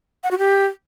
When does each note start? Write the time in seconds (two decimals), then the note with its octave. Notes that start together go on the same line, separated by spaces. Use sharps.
0.23 F#5
0.31 F#4
0.38 G4